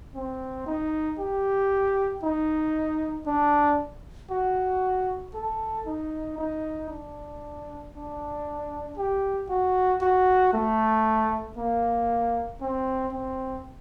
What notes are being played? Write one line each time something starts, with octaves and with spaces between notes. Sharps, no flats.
C4
D#4
G4
D#4
D4
F#4
A4
D#4
D#4
D4
D4
G4
F#4
F#4
A3
A#3
C4
C4